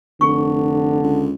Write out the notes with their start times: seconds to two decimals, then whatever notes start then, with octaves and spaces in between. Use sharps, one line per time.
0.21 F1 D3 G#4 C#6
1.03 C#2